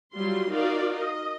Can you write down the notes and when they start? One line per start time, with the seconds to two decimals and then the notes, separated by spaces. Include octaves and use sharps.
0.14 F#3 G3 F4 C6
0.52 D#4 F4 F#4 A#4 D5 F5
0.97 D#5